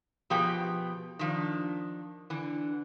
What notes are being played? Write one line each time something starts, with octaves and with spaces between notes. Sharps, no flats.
B2 F3 B3 G4 G#4 G5
D#3 F3 D4
D3 E3